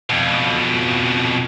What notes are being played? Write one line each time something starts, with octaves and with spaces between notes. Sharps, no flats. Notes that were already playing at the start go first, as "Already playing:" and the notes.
F2 B2